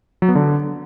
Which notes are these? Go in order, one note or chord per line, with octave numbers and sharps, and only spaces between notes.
F#3
B3
D3